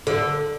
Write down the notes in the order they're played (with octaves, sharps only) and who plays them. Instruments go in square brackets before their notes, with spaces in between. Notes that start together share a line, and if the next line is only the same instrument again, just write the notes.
[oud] D3